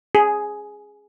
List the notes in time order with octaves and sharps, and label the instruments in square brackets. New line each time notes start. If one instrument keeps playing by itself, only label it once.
[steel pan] G#4